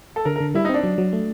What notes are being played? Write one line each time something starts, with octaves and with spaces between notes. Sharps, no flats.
A4
D3 A#4
A#4
D3
G3 E4
D#4
C4 D4
F#3
F#3
A3